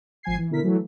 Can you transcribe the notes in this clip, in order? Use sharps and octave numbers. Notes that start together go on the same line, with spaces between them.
G#1 F3 G#5 G#6 C7
E3
B2 D3 E4 A#4 B6
E3 F#3 A3